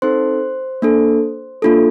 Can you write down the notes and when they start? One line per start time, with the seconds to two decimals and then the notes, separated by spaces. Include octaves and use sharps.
0.02 C4 D#4 A4 C5 C6
0.82 A#3 D4 A4
1.62 A#3 D4 F4 A4